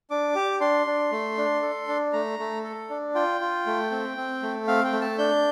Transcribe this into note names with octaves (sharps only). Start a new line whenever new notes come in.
D4 D6
G4
D4 C6
D4
A3
D4
A4
D4
A3 A#5
A3
A4
D4
F4 G5
F4
A3
C4
C4
A3
C4 F5
G5
A3
A5
D4 G6